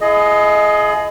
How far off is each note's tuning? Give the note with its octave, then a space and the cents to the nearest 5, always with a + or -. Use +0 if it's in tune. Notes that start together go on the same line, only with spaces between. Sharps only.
E4 +35 G#4 +25 D#5 +0